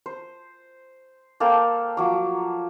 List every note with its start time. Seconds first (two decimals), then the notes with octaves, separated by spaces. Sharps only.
0.06 C5
1.40 A#3 A4 C5 G5
1.97 F3 F#3 D6